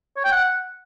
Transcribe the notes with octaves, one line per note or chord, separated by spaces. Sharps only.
C#5
G5
F#5